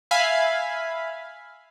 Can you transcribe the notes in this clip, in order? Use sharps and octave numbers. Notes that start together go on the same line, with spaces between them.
E5 F5 G#5 B5